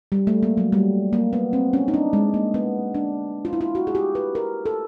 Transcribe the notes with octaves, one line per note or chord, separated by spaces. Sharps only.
G3
A3
A#3
F#3
G3
A#3
B3
C4
C#4
D#4
D4
G#3
A#3
B3
D4
F4
E4
F4
F#4
G#4
G4
B4
A#4
A4